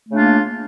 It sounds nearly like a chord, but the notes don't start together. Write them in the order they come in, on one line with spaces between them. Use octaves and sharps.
A3 C#3 D4 A#3 F4